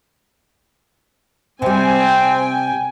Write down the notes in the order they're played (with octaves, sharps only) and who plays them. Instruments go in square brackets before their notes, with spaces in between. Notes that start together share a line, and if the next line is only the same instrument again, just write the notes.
[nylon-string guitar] C3 G3 [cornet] C4 [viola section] G5 G#5